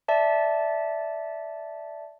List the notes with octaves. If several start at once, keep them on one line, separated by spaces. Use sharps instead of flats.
D5 E5 A5